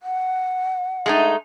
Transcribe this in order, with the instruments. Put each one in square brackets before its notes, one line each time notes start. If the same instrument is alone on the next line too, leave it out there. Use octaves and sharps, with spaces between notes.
[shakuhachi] F#5
[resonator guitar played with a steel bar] G#3 A3 D#4